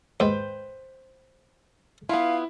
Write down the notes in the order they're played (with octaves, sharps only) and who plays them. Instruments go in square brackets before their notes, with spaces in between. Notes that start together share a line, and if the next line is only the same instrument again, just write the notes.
[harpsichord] D#2 G#2 [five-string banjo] B4 C5 G5
[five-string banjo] B3 F4 [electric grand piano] E4 [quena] F5